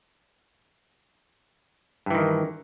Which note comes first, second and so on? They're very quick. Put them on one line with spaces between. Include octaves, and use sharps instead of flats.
G2 E3 D#3